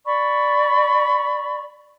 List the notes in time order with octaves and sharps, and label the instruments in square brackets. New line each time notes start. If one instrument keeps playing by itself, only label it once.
[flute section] D5 B5 C#6